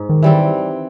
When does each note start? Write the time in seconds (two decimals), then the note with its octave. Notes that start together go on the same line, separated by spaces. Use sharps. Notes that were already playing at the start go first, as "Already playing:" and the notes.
Already playing: G#2
0.09 D#3
0.23 E3 G3 C4